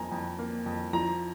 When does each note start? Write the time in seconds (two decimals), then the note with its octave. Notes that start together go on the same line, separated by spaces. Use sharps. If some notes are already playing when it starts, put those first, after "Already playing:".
Already playing: F2 A#3 G#5 A#5
0.11 F2
0.39 A#3
0.66 F2
0.93 F3 A#5